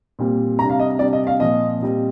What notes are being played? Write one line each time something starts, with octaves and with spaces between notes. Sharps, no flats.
A#2 G3 C4
C3 G3 D4 A#5
F5
D#5
C3 G3 D4 D5
D#5
F5
A#2 F3 C4 D#5
A#2 G3 C4